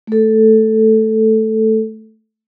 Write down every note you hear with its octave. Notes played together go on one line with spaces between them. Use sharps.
A3 A4